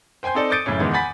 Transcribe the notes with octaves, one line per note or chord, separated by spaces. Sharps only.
C5 G5 G#5 C6 G6
C4 D#4 A4 D5
D6 D#6 G6 A6 C#7 D7
F#1 F#2 A2 C#3 C#4
E2 D#3 G#3 B3
F#5 G#5 B5 A6 B6